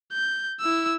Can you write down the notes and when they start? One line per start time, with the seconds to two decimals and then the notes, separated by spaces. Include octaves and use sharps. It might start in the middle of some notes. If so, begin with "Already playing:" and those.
0.13 G6
0.60 E4 E6